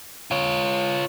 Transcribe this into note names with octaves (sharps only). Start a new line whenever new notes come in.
F4 C#5